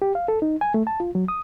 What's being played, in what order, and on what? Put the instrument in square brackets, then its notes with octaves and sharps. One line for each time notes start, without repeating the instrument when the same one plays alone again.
[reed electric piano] G4
F5
A4
D#4
G#5
A3
A5
F4
F#3
D#6